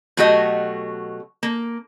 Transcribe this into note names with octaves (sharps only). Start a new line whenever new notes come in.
B2 F#3 A3 F#4 G4 D#5
A#3